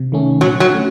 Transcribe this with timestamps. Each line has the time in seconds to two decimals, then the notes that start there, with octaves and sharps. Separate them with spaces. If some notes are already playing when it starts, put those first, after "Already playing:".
Already playing: C3
0.12 D#3 A3 C#4
0.41 A#2 F#3
0.60 F#3
0.70 A3 C#4